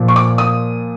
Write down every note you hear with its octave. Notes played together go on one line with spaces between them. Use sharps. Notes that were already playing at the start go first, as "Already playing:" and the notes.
Already playing: A#2 F3
C#6
D6
D#6